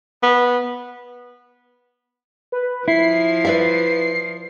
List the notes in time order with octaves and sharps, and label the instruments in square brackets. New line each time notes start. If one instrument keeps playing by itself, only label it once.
[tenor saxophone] B3
[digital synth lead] B4
[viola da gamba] F3 [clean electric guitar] E4 [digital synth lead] C7
[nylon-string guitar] B4 D5 E5